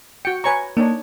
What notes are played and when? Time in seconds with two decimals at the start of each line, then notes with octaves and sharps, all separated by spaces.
0.25 F#4 G5 C#7
0.44 B4 C#5 G#5 A#5 C#6
0.77 A#3 D4 D#4 C#5